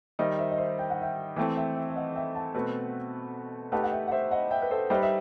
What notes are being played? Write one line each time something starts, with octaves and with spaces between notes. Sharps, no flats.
D#3 G3 D#4 C5 E5
C5 E5
D#5
C5 E5
G5
F#5
E5 G5
E3 A3 C4 E5 G5
E5 G5
E5 G5
E5
D#5 F#5
E5 G5
F#5 A5
B2 A3 C4 F#4 B4
A3 D#4 G4 B4 F#5 A5
F#5
E5 G5
F#5
C5 E5
D#5 F#5
E5 G5
B4
A4 C5
G3 D#4 G4 B4 C5 E5
E5